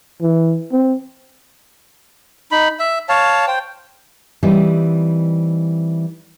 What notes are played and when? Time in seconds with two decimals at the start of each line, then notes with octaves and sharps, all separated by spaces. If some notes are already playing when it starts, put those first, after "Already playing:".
0.22 E3
0.72 C4
2.51 D#4 B5
2.79 E5
3.09 C#5 F5 A5
3.47 C5 G5
4.43 E3 G3 C4 D#4